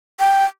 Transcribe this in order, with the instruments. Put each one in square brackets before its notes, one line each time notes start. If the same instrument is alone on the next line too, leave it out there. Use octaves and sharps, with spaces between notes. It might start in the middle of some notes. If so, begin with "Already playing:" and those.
[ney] G5